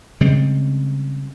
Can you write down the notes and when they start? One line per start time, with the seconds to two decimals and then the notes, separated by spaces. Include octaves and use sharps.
0.21 C#3 G3 G#3 C4